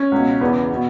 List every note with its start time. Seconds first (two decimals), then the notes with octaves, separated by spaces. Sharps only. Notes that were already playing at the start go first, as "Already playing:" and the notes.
Already playing: C#4
0.12 C#2 B2
0.41 E2 C#3 E3 B3
0.74 B2